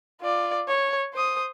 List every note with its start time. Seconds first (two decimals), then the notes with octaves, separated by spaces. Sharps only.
0.21 F4 D5
0.68 C#5
1.13 C5 D#6